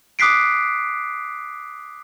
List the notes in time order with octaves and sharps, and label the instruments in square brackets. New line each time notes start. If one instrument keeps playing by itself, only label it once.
[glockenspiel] D6 D#6 F#6 B6 C7 D7